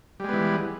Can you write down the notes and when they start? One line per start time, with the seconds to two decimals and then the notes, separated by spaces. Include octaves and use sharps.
0.20 G3
0.24 G#3
0.29 B3
0.33 E3